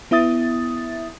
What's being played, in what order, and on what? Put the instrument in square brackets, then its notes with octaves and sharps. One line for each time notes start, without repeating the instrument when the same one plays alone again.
[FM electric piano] B3 E4 E5 D#6 A6